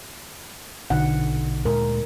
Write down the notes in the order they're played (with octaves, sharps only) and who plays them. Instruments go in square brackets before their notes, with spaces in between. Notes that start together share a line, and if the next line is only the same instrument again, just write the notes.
[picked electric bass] A#1 B2 [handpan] D3 D#4 F#5
[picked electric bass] D2 A#2 G#3 [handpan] A#4